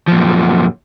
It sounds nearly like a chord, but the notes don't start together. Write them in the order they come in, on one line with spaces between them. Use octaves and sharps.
F3 A#2 F#2